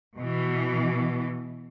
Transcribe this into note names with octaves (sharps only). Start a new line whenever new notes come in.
B2 E3